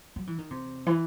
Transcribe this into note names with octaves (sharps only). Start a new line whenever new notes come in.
F#3
E3
D#3
C3
E3